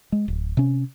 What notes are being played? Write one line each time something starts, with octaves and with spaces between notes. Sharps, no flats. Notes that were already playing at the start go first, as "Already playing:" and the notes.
G#3
D1
C3 C#4